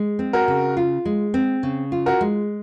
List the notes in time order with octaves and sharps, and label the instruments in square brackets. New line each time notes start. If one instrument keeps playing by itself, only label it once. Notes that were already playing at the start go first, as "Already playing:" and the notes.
Already playing: [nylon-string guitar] G#3
C4
[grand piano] F#4 A#4
[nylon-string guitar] C#3
F4
G#3
C4
C#3
F4
[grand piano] F#4 A#4
[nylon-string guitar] G#3